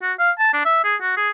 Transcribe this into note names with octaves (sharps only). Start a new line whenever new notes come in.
F#4
F5
A5
D4
E5
G#4
F#4
G#4